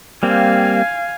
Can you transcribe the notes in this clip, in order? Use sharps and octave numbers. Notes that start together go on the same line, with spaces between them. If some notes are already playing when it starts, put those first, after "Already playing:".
G3 A#3 C4 F5 G#5